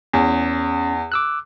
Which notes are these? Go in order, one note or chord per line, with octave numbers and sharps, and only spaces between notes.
E2 C#4
D6 E6 F#6